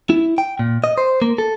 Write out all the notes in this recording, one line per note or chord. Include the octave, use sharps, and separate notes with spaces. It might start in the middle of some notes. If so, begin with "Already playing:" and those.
E4
G5
A#2
D#5
C5
A#3
A4